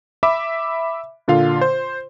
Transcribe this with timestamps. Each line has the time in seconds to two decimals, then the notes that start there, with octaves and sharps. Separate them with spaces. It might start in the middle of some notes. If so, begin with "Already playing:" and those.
0.23 E5 B5 D6
1.28 A#2 D3 F4 F5
1.61 C5